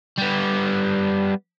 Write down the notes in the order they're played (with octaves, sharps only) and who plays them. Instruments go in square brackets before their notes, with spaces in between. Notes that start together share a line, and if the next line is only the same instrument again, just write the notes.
[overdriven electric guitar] G3 B3